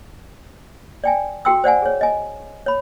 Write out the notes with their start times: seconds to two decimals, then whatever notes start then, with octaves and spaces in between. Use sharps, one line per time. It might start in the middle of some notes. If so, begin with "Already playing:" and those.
1.04 D5 G5 G#5
1.45 F#4 A4 G5 C6 E6
1.64 C5 D5 F#5 G#5
1.82 G#4 C#5
2.01 D#5 G#5
2.66 C#5 B5